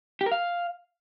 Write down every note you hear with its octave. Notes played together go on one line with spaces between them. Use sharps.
G4
A#4
F5